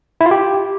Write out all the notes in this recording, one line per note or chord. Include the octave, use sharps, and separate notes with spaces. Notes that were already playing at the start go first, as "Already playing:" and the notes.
E4
F4
G4